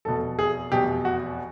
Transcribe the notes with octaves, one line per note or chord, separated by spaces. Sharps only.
F1 E2 B2 A4
G#4
F1 E2 B2 G4
F#4